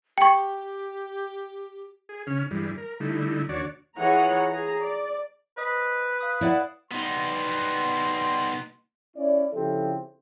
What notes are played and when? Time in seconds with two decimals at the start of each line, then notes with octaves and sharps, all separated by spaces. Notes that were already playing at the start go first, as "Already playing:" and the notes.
0.18 G4 G5 C#6
2.09 G#4
2.27 C#3 C#4 F6
2.51 G2 E3 G3 G#3
2.78 A#4
3.00 D3 G3 A3 D#4 E4
3.49 D#2 D4 F#4 C#5 D5
3.96 E3 F4 G#4 C#5 F#5 A#5
4.47 G#4 A#5
4.80 D5
5.57 B4 C5 D#5 D#6
6.18 F5 D#6 F#6
6.41 E4 D5 F#5
6.92 G3 B3 D#4 C6
9.17 C#4 E4 D5
9.54 C#3 F3 C4 E4 G4 A4